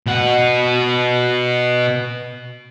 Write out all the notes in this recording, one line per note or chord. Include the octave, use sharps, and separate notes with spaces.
B2 F#5